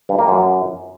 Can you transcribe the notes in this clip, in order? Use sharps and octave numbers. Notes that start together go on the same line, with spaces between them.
G2
A#3
F#2